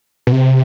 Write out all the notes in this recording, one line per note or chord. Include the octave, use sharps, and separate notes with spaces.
B2
C3